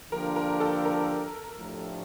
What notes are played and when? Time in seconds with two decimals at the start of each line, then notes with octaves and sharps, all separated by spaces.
0.12 D3 F3 A#3 D4 G4 A#4
0.36 A#4
0.60 A4
0.85 A#4
1.58 A2 F3 A3 D4 G4